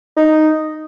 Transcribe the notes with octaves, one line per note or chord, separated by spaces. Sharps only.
D#4